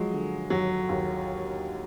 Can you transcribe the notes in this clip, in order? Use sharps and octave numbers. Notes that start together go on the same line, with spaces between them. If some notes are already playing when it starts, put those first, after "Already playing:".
Already playing: F3 F#3 G#3
D3
D#2 F#3
D#2